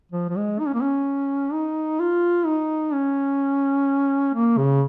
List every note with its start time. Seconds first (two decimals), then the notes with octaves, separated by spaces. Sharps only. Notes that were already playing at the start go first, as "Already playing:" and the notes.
0.12 F3
0.29 F3
0.36 G#3
0.59 D#4
0.66 C#4
0.74 A#3
0.81 C#4
1.52 D#4
2.00 F4
2.46 D#4
2.93 C#4
4.34 A#3
4.57 C#3